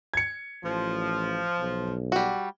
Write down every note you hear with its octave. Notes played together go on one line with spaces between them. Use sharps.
G#6 C#7
A1 F3
B1
G3 F#4